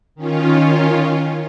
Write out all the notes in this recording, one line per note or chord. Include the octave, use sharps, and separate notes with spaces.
D#3 C#4 F4